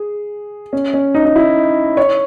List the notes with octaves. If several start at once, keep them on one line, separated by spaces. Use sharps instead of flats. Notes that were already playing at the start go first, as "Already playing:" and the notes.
Already playing: G#4
C#4
C#4
D#4
D#4
E4
C#5